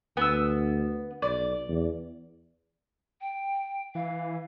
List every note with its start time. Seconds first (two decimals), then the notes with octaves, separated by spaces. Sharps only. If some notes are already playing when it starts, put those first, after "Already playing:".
0.17 D2 B3 E6
1.22 B1 D5
1.68 E2
3.21 G5
3.95 E3 F5